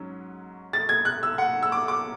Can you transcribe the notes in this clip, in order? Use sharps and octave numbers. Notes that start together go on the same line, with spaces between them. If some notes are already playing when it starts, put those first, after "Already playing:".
Already playing: G#2 F#3 C#4
A6
G#6
F#6
E6
F#5
E6
D6
D6